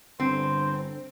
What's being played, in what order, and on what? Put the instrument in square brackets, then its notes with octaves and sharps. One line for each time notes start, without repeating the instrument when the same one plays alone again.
[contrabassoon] G1 [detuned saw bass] D3 [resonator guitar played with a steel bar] C4 [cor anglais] C5